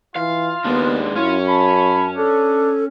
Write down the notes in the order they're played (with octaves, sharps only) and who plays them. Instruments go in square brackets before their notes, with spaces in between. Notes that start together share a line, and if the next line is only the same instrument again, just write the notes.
[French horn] E3 [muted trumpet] F4 [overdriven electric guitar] F5
[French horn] D#2 [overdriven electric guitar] G#3 D4 [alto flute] B3
[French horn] F#2 [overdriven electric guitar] C#4 C#5 [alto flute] E4 [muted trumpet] F4
[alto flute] A5 [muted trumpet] B5
[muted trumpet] D4 [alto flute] A4